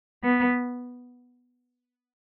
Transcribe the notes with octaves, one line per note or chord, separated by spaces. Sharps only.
B3